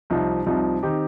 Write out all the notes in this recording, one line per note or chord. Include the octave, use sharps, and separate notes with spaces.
C2 C3 F3 D#4
C2 C3 F3 D#4
D#3 C4 D#4 G4